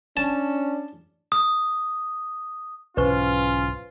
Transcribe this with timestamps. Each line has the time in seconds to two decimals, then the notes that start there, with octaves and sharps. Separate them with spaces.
0.17 C#4 D4 A5
1.32 D#6
2.97 B1 G#2 E3 C#4 F4 B4 C5 C#6